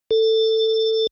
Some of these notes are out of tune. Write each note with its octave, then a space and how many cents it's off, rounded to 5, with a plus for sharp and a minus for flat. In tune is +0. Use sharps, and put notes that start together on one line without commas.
A4 +15